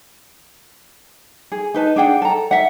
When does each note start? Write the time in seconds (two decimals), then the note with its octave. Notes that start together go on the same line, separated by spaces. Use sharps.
1.52 G#4
1.74 D#4 B4 A5
1.96 D4 G#4 F#5 G5
2.22 A4 A#5
2.51 E5 F#5